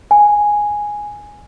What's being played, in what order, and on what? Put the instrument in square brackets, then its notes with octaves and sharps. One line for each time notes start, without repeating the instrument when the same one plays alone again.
[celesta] G#5